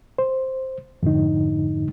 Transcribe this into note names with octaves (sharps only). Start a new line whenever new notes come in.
C5
F2 G#2 D3 D#4